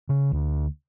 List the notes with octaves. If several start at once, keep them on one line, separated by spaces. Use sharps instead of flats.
C#3
D2